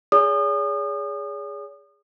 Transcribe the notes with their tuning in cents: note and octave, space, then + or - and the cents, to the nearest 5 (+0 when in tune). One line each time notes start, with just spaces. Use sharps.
G#4 -10 C#5 +45 D#6 -35